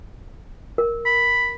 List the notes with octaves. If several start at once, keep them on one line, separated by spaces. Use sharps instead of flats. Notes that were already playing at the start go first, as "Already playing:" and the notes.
A#4
B5